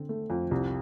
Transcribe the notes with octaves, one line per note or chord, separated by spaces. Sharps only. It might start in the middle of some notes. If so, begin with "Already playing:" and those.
Already playing: D3 C4
A3
F2
C2